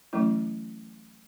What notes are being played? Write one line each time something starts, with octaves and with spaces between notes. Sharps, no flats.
E3 F#3 A3 C#4 E4